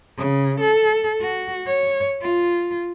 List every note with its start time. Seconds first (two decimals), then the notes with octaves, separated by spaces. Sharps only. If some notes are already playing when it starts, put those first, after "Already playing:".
0.17 C#3
0.60 A4
1.21 F#4
1.67 C#5
2.22 F4